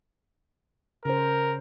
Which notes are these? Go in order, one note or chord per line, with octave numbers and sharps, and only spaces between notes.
C#3 A#4 C5